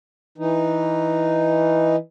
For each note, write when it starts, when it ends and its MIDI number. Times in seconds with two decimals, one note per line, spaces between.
0.38 1.96 52
0.38 1.96 63